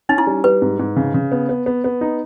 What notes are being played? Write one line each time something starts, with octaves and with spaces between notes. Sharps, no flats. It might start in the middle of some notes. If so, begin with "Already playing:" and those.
C#4 D#4
E4
G3
G3 B4
G#2
G#2
C#3
C#3
B3
B3
B3
B3
D#4